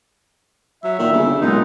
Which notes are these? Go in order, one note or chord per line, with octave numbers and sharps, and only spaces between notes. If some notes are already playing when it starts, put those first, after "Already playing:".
F#3 E5
A#2 D#3
G1 C#3
B1 A#2 G#3 B3 D#4